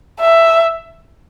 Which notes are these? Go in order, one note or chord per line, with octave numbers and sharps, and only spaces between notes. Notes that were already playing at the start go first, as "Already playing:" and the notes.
E5